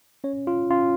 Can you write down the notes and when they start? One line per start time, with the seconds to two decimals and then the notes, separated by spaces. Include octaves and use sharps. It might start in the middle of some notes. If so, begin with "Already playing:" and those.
0.24 C#4 C#5
0.47 F4
0.70 C#4 F4